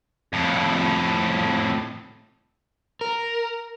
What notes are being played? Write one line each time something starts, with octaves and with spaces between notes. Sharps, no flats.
F2 A2
A#4